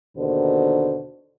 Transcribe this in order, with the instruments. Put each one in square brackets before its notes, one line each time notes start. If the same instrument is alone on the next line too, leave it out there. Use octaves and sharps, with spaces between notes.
[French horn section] D#2 B2 D3 D#3 C5